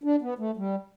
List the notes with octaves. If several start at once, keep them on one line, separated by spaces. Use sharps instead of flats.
D4
B3
A3
G3